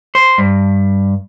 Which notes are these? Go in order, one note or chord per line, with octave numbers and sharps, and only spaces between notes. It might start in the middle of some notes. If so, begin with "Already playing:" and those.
C5
G2